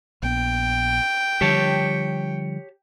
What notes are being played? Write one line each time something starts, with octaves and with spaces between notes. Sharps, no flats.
A#1 B3 G5
D3 F3 G3 G4 C#5 A5